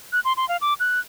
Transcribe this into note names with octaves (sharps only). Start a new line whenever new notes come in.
F#6
C6
C6
F5
D6
F#6